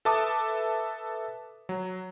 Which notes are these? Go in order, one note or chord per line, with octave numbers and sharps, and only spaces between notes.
A4 B4 E5 A5 D6 D#6
F#3